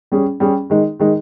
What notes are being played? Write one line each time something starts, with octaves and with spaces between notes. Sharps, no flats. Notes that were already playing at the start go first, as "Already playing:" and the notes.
G3 C#4 G#4
G3 C#4 G#4
D#3 G#3 D#4
D#3 G#3 D#4